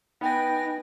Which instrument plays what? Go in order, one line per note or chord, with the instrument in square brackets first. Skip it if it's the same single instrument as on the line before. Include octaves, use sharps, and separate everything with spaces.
[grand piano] B3 [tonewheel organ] D#4 [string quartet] B4 G#5 A#6 [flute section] G5